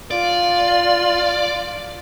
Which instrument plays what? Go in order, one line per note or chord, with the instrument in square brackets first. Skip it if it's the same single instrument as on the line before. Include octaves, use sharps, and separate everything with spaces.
[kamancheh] F4 [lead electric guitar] D5